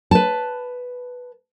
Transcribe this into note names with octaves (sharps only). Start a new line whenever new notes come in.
B4 A5